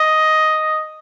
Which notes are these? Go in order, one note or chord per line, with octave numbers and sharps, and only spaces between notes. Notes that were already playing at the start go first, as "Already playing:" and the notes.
Already playing: D#5